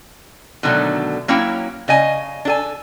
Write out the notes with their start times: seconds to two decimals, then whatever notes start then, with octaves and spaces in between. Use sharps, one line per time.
0.63 B2 D3 D#3 F#3 A3
1.28 F#3 A#3 C#4 E4 G5
1.88 C#3 D#5 G#5
2.45 D4 A4 G#5